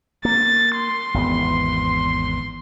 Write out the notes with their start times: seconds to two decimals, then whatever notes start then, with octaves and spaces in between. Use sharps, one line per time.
0.25 A#3 A6
0.76 C6
1.14 G#1 E2 B3